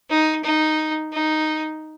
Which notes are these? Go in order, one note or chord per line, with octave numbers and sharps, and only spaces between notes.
D#4
D#4
D#4